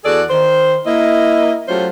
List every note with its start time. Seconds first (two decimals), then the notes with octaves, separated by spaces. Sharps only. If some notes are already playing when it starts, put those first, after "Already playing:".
0.04 E2 F#4 G#4 A4 D5
0.30 D#3 C5
0.86 A#3 E4 D#5
1.68 F#3 A3 C#4 F4 G4 C5